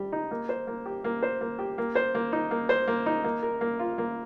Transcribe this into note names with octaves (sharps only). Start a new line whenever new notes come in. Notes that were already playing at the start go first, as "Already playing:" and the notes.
Already playing: G3 G4
D#4
A#3
C5
A#3
G4
A#3
C5
A#3
G4
A#3
C5
A#3
D#4
A#3
C5
A#3
D#4
A#3
A#4
A#3
F4
A#3